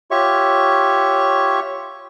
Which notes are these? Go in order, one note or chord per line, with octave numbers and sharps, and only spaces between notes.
F4 G4 C#5 E5 C#6